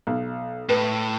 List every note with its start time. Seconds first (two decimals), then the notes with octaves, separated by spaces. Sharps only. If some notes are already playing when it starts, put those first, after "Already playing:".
0.07 B1
0.69 A2 B4